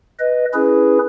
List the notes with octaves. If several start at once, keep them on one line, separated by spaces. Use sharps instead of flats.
B4 D#5
C#4 E4 G#4 B4